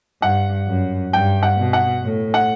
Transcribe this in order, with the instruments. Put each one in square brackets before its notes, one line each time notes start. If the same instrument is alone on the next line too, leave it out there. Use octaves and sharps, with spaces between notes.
[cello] G2 [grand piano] F#5
[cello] F#2
[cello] G2 [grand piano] G5
[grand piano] F#5
[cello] B2
[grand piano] F#5
[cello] A2
[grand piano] F#5